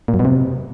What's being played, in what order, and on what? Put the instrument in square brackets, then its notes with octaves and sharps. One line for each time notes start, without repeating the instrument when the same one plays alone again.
[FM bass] A#2
F#2
B2
C3